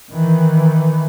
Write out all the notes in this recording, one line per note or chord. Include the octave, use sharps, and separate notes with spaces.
D#3 E3